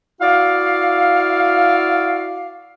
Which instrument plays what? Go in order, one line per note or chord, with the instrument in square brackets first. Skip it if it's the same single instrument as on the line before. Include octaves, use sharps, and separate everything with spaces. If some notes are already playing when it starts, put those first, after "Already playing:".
[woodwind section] E4 F#4 D5 F5